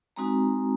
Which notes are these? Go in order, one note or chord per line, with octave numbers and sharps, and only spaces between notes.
G#3 C4 D#4 F#4 A#5